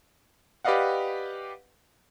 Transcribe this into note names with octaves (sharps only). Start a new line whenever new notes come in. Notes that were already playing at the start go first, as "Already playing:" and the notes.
G4 B4 D5 D#5 F5 F#5